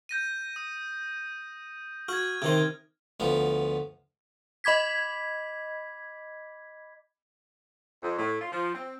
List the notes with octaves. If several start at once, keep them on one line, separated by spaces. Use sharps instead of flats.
G6 A#6 D#7
D#6
F#4 F6 G#6
C3 D#3 C5
D2 F3 B3
D#5 B5 D6 G#6 B6
F2
A2
F4
F3
C4